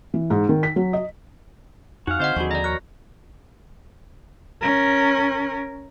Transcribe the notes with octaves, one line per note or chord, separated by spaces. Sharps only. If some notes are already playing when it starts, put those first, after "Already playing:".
E3
G#2
D#3
B6
F#3
D#5
F2 D#4 F#4 F5 F#5
D3 C4 C5 D#5 F#5
D#2 D3 F3 F#4 G#4 C#6
D5 D#5 A#5
A#4 C#5 F#6
C#4 A#4